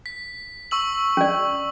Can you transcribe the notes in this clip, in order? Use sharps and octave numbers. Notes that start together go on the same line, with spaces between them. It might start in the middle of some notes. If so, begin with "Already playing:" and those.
B6
C#6 E6 F#7
C#4 D5